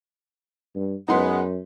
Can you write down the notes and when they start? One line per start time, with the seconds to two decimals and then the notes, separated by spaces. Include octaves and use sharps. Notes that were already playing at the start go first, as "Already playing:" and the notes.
0.76 G2
1.08 F#2 G#3 B3 D#4 B4 C6